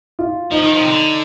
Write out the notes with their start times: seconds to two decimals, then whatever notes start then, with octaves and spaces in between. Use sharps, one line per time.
0.19 F4
0.51 F3 D#4
0.62 D#3
0.73 F3
0.80 C3
0.85 D3